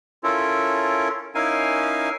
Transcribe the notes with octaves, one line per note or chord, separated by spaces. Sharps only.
C#4 E4 F4 A4 A#4
C#4 D#4 E4 A#4 F5 G#5